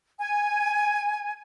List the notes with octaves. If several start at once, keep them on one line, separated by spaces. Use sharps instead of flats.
G#5